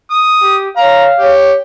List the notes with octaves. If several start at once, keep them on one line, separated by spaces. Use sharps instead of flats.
D#6
G4
C#5 F5 A#5
G4 C#5